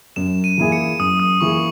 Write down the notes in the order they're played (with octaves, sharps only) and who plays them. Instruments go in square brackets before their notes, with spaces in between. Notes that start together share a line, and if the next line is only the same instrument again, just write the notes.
[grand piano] F#2 [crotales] E7
[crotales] D#7
[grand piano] E3 A#3 E4 G#4
[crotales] C#7
[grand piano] F#2 [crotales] D#6
[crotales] D#6
[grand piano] E3 A#3 E4 G#4 [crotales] C#6